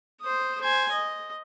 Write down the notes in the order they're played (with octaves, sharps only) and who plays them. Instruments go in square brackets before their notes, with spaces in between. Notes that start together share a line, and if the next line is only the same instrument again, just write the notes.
[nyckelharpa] C5 D#6
C5 G#5
D#5